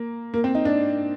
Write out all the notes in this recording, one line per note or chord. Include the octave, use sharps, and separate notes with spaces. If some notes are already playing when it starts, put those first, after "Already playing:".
Already playing: A#3
A#3
C4
D#4
D4